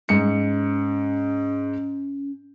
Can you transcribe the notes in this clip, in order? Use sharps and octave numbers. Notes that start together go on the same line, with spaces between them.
G#2 C#4 C#7